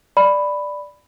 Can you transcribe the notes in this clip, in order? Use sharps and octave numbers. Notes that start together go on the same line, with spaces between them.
D5 B5